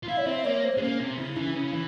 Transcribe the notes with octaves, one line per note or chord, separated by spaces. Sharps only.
F4
E4 F5
C#5
C4 E5
A#3 C#5
C5
G#3
A#3 C#4
C3
C#3 E4
E3 C#4
C#3 E4
E3